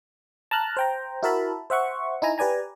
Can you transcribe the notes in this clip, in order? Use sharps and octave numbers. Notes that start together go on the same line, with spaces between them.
A5 A#5 F6 F#6
C5 G5 A#5
E4 F#4 A#4 E5 A5 B5
C5 E5 F#5 C#6
D#4 E4 G#5 A#5
G4 B4 D5 G#5 A#5